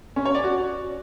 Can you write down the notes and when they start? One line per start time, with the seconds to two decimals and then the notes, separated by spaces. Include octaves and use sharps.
0.16 C#4
0.25 C#5
0.35 D5
0.44 F#4